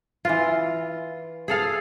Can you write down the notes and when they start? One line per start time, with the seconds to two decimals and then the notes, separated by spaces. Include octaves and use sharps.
0.25 E3 F4
1.48 G#4 A4 F5